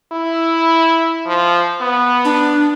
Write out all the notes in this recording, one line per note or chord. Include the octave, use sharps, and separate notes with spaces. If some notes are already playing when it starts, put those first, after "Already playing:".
E4
F3
B3
D4